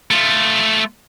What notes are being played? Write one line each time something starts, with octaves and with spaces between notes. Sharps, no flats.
A3 F4